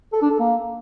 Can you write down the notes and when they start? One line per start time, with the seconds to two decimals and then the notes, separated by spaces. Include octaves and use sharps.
0.13 A4
0.22 D4
0.31 A4
0.39 A#3